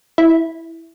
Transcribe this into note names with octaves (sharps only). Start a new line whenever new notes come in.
E4